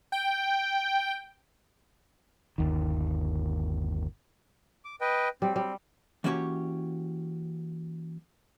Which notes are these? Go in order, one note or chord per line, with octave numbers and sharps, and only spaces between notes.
G5
G1 D#2 D#3
D6
B4 D#5 G5
G3 C4
G3
E3 A#3 C#4 F#4 G4 C#5